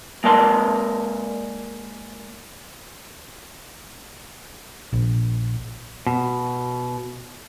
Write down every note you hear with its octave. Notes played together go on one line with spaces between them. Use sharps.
G#3 A#3 A#4 D5 A5 C6
A#1
B2